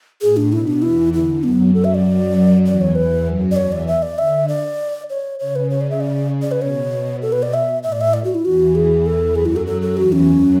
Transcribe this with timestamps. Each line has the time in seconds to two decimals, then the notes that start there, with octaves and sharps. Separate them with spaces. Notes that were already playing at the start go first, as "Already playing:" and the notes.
0.22 A2 G#4
0.37 D4
0.52 B2 E4
0.68 D4
0.82 E2 E3 E4
1.13 D3 E4
1.43 F#2 F#3 B3
1.73 F#2 F#3 A4
1.84 E5
1.94 D5
2.05 F#2 F#3
2.65 E2 E3 D5
2.81 C#5
2.95 E2 E3 B4
3.26 F#2 F#3
3.51 D5
3.56 E2 E3 C#5
3.72 D5
3.87 E5
4.03 D5
4.18 D3 E5
4.48 D5
5.10 C#5
5.39 C#3 C#5
5.56 B4
5.70 C#5
5.81 D5
5.91 E5
6.01 D5
6.42 D5
6.52 B4
6.61 B2 C#5
7.22 B2 A4
7.32 B4
7.43 D5
7.54 E5
7.83 A2 E5
7.92 D5
8.01 E5
8.14 D5
8.24 F#4
8.35 E4
8.44 E2 E3 F#4
8.75 G#4
9.06 A4
9.35 F#2 F#3 G#4
9.46 E4
9.56 A4
9.67 A4
9.82 A4
9.97 E2 E3 F#4
10.12 C#4
10.28 F#2 F#3